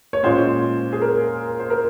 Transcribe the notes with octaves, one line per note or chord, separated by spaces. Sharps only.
C#5
A#2 G#3 C#4 C5
G#4
A#4
C5
A#4